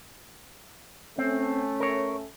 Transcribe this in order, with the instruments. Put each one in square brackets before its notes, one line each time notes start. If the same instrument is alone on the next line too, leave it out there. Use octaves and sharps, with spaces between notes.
[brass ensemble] A3 C#4 [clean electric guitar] C4
[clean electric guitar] A#4 C#5